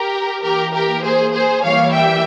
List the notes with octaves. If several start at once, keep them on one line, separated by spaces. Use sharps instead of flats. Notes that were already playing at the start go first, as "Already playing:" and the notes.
Already playing: G4 A#4
E3 A#3 G4 A#4
G4 A#4
G#4 C5
G#4 C5
E3 G3 A#3 C#5 F5
E5 G5